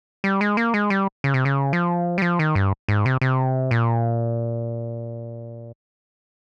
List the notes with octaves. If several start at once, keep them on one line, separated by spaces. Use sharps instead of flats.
G3
G#3
A#3
G#3
G3
C#3
C3
C#3
F3
G3
F3
D#3
G2
G#2
C3
C3
A#2